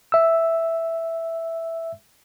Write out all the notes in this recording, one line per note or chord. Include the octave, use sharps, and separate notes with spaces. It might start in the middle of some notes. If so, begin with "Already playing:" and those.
E5 E6